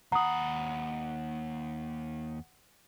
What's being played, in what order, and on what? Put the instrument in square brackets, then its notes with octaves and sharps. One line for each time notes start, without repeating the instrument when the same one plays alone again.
[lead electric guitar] D#2 B5 [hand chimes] F#5 [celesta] A#5 D#6